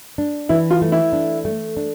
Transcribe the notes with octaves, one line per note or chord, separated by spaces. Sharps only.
D4
E3 E4
F4
A3
E4
D4
A3
D4